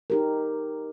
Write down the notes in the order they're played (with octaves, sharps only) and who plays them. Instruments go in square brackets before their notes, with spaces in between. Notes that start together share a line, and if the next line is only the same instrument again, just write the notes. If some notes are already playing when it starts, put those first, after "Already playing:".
[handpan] D#4 G4 A#4